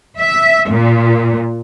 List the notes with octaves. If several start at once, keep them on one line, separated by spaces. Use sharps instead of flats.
E5
A#2